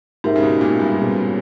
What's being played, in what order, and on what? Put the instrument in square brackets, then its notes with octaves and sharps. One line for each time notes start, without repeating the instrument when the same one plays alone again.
[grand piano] G#2 [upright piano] G#3 D#4 G4 A#4 E5
[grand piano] C#3
B2
A#2
G2
[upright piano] B2 G3 C#4 G#4 C#5